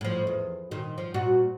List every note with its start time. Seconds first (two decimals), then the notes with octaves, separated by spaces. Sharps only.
0.01 A2 F3
0.27 E2
0.71 A#2 D#3
0.98 F3
1.14 A#2 F#4